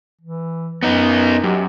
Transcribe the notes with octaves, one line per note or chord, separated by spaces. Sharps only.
E3
F#2 B3 D#4
F#2 G4